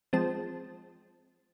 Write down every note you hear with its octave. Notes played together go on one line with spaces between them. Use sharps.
F3 G#3 C4 A5